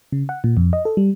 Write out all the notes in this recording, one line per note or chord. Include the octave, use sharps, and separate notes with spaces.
C#3
F#5
A#2
F2
D#5
A4
G3